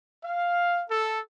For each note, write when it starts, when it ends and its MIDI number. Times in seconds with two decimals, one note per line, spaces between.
0.24 0.84 77
0.90 1.20 69